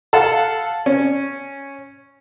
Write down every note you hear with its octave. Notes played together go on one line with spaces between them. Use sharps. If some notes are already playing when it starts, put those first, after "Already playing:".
A4 F5 F#5 A5
C#4